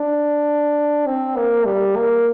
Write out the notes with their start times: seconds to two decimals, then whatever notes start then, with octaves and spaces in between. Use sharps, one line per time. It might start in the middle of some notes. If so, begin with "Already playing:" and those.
Already playing: D4
1.07 C4
1.36 A#3
1.65 G3
1.96 A#3